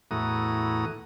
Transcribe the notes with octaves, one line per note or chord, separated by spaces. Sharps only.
E2 A2 F#4 A#5 D#6